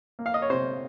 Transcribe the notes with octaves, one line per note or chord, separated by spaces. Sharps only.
A#3
F5
D#5
C#5
C3 C5